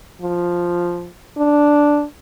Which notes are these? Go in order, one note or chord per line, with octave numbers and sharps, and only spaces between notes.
F3
D4